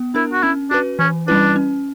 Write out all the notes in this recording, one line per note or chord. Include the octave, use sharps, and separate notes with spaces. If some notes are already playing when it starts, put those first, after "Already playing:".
Already playing: B3
D4 E4 A#4
F#4
C#4 E4
D4 F#4 B4
E3 C#4
G3 C#4 D4 E4 B4
C#4